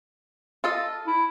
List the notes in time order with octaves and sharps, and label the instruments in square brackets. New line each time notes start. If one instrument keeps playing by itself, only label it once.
[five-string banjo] F4 A4 D#5
[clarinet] E4